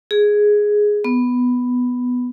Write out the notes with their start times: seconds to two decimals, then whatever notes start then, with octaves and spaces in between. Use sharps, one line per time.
0.11 G#4
1.04 B3